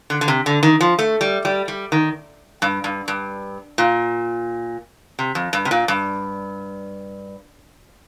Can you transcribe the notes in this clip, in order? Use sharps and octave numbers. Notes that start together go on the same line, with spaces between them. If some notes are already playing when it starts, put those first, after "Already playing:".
D3
D3
C3
D3
D#3
F3
A3
G3
G3
G3
D#3
G2
G2
G2
A#2
C3
F2
G2
C3
A#2
G2